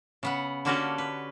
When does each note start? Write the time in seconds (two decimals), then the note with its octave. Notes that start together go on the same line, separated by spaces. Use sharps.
0.23 C#3 B3 F#5
0.65 D3 A#3 C#4 F#4 G4 A4
0.98 B4